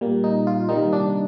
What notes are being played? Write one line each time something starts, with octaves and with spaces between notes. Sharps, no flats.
A#2 G3 A#3
D#4
F4
C3 D#3 G3 A#3 D#4
D4